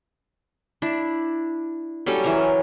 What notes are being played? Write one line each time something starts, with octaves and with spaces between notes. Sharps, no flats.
D4 E4
F#3 G3 C#4 A4
E3 F#3 A#4 C#5